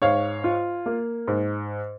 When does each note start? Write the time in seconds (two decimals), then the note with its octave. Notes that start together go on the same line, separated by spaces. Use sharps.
0.02 G#2 C#5 F5
0.44 F4
0.86 A#3
1.28 G#2